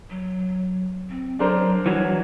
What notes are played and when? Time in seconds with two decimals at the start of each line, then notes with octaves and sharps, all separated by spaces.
0.10 F#3
1.10 C4
1.39 F#3 D4 A#4 C5
1.86 E3 F#3 G3